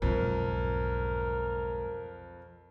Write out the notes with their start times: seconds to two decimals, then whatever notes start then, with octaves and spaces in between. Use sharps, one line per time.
0.02 B1 F2 G#2 A#4